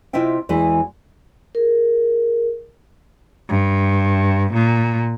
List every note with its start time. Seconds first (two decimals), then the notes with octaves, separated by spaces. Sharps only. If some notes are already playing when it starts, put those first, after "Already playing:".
0.13 C3 E4 F4 D#5 E5 G5
0.49 E2 E3 G#3 F#4
1.55 G#4 A#4
3.49 G2
4.54 A#2